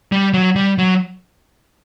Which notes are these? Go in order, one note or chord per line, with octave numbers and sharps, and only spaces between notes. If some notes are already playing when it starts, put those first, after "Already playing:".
G3
F#3
G3
F#3